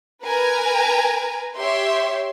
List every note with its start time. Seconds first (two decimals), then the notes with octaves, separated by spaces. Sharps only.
0.24 A#4 B4 G#5 A#5
1.57 G4 C#5 E5 C6